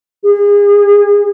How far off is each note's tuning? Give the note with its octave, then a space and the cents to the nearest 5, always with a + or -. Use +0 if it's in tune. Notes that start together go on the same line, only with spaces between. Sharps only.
G#4 -35